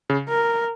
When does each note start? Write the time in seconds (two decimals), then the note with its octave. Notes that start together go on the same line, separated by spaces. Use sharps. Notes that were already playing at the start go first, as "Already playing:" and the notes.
0.10 C#3
0.29 A#4